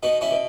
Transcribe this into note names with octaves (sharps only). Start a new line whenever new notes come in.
B2 B3 D#4
C#4 E4
B2